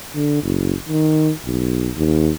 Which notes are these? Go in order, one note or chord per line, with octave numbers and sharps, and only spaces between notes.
D3
F#1
D#3
B1
D#2